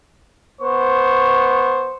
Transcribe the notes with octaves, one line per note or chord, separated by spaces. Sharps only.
B3 C5 C#6